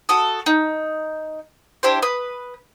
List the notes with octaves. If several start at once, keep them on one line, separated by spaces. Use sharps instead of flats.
F#4 A4 D#6
D#4
D4 E4 G4 C5
B4 D#6